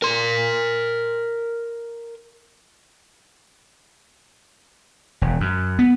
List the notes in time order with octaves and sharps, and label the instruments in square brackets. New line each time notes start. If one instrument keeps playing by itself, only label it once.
[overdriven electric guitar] A#4 C6
[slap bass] E1
F#2
B3